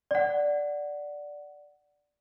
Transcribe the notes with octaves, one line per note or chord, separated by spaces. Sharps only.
D5 F#5